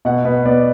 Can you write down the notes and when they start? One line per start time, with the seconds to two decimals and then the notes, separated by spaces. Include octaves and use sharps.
0.05 B2 F#5
0.25 B2 B4
0.45 B3 D5